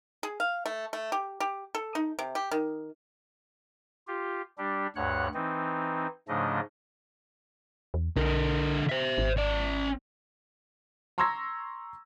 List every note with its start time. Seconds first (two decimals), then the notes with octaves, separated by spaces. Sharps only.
0.23 G#4
0.40 F5
0.66 A3
0.93 A3
1.12 G4
1.40 G4
1.75 A4
1.95 D#4
2.19 C3
2.35 G4
2.51 D#3
4.07 F4 G4
4.58 G3 D4 G4
4.96 D2 G2 C#5 F#5 F#6
5.34 E3 C4 D#4
6.28 G#2 C#3 F3 A3 D4 D#5
7.94 E2
8.16 B1 D3 A#4
8.89 C5 E5
9.18 G#1
9.37 C#4 D5
11.18 A#5 C6 C#6 E6 G#6 A#6